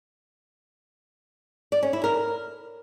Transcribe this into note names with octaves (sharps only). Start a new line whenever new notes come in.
D5
C#4
E4
A#4